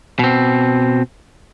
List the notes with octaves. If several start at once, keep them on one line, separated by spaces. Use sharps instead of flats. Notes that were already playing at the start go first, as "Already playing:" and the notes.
B2 C4